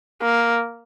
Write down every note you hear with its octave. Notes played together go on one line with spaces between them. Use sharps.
A#3